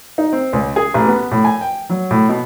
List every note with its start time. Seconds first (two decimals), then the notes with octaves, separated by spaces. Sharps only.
0.18 D#4
0.33 C4
0.53 C#2
0.76 G#4
0.94 A1
1.08 B3
1.31 A2
1.45 G#5
1.61 G5
1.90 F#3
2.11 A2
2.29 B2